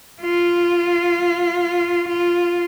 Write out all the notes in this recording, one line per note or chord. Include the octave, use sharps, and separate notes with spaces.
F4
F4